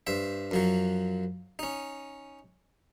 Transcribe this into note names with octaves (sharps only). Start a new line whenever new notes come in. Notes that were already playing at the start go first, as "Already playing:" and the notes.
G2 C5 E5
F#2 F3 F#3
C#4 D#4